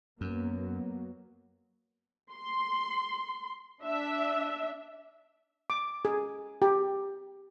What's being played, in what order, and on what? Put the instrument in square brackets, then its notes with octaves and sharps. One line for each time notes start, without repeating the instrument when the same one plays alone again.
[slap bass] F#2 [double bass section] F#3 A#3 B3
[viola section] C6
D4 E5
[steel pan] D6
G#4
G4